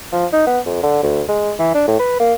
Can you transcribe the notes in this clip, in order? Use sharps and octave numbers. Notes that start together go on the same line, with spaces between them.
F3
D#4
B3
F2
D3
D2
G#3
E3
D4
A2
B4
A#3